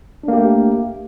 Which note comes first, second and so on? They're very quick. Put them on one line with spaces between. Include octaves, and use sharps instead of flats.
D4 A#3 G4 A3